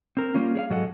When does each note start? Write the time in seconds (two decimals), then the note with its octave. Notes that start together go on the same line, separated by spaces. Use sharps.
0.17 C4 A#4
0.34 G3 A#3 C#4 F4
0.55 G#4 C#5 F5
0.70 G#2 F#3 G#4 A4 D#5 F#5